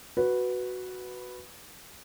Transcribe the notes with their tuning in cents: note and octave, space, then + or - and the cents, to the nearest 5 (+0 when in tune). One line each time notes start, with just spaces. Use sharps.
F#4 +0 B4 +0